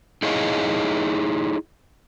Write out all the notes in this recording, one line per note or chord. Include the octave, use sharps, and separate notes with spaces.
D#4 E4 G#4 C#5 D#5 F5